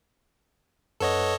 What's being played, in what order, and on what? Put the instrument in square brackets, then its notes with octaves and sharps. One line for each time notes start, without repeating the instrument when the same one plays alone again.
[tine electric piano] F#2 B4 F#5 [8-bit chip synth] A4 C#5 D#5